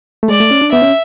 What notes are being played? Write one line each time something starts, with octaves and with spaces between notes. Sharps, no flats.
A3
G#3 D5
A3
C#4
D4
B3 E5
C#4